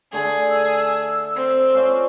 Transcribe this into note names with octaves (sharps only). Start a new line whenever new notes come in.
D3 A3 G#4
E6
C4
C#4 F4 D5